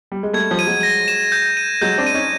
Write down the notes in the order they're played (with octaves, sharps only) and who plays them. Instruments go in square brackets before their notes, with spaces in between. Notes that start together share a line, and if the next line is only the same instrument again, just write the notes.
[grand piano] G3
G#3
[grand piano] G3 A3 [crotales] G#6
[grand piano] F3 G3
[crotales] D#7
[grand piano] F#3 G#3
[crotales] A#6
E7
G6
D#7
[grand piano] F#3 G#3 [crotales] G6
[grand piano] C4 D4
[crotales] D#7
[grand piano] C#4 D#4